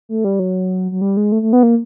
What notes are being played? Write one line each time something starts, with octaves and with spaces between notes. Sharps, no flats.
A3
G3
F#3
F#3
G3
G#3
A3
A3
B3
A#3